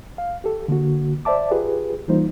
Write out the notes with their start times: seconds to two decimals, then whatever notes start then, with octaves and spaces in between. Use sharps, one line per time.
0.18 F5
0.44 G4 A4
0.68 D3 A#3 F#4
1.25 C5 D5 E5 A5 D6
1.51 F4 G4 G#4 B4
2.08 E3 G3 A#3 D#4 F4 C5